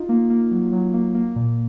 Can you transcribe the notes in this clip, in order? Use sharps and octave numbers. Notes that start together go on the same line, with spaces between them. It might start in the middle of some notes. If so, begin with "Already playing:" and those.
Already playing: D#4 F4
A#3
A#3
F#3
F#3
A#3
A#3
A#2